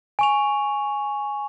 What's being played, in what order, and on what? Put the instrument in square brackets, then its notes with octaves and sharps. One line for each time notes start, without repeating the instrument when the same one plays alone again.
[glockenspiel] G#5 C#6 F7